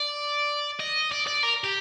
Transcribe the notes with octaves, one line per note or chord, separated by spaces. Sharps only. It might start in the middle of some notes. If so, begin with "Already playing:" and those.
Already playing: D5
D#5
D5
D5
A#4
G4